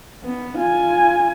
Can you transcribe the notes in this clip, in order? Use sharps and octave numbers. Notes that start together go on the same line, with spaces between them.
B3
F4 G#5